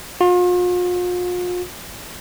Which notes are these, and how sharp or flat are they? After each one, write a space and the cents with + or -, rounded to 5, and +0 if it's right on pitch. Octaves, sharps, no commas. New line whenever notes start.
F4 +40